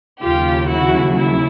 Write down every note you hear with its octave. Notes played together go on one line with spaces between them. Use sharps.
D#2 C#3 F#3 F4 G4
E4 F#4
E4